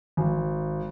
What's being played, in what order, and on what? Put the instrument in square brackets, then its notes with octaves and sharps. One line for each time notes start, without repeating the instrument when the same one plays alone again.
[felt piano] G#1